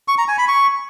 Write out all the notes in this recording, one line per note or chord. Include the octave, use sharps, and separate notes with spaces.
C#6
A#5
G#5
B5
C#6